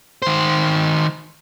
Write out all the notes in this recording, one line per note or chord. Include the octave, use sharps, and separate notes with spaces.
D#3 C5